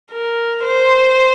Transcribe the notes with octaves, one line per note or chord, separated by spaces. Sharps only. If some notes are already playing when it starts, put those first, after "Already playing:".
A#4
C5